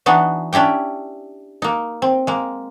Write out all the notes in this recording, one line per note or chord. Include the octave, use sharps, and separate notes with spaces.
E3 B3 D4 D#4 F#4
C#4 D4 E4 G4 G5
A#3 D#4
C4
G#3 A#3